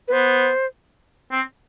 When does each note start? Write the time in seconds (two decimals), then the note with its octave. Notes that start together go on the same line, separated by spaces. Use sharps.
0.08 B4
0.12 B3 C5
1.32 C4